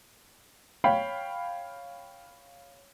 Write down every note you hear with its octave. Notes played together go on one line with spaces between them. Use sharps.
C#5 F5 G5 B5